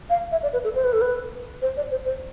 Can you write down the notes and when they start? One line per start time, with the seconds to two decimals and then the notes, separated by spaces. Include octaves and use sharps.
0.10 F5
0.32 E5
0.43 D5
0.53 B4
0.64 A4
0.75 C5
0.84 B4
0.93 A4
1.01 B4
1.62 C5
1.77 D5
1.91 C5
2.05 C5